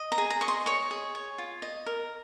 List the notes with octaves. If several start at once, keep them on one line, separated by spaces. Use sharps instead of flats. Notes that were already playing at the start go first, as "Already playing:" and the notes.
Already playing: D#5
A#5
G#4
A#5
D#5 C#6
C6
C#5 C#6
G#4
C#5
F4
D#5
A#4